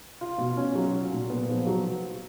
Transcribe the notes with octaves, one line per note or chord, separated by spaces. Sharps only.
F4
B2
C#4
F#3
F4
A#2
B3
F3
F#3